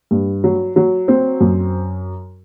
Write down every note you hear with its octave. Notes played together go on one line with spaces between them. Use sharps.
G2
F#3
F#3
C4
F#2